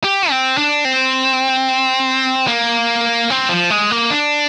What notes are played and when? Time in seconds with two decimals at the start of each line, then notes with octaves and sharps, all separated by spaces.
0.04 G4
0.30 C4
0.57 D4
0.85 C4
2.47 A#3
3.30 C4
3.49 F3
3.70 G#3
3.91 A#3
4.11 D4